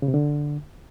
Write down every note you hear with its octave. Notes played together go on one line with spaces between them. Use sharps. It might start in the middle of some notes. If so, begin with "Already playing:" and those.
C#3
C3
D3